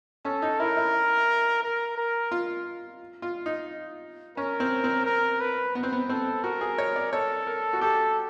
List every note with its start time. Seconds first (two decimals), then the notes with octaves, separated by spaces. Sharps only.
0.25 C#4 A4
0.42 D#4
0.60 E4 A#4
0.77 E4
1.63 A#4
1.97 A#4
2.32 F4
3.22 F4
3.46 D#4
4.37 C#4 A#4
4.60 C4
4.84 C4
5.06 A#4
5.40 B4
5.75 B3
5.83 C4
5.92 B3
6.09 C4 A4
6.43 F#4 A#4
6.61 G#4
6.78 C#5
6.96 D5
7.12 A4 C#5
7.47 A#4
7.73 F#4
7.81 G4 A4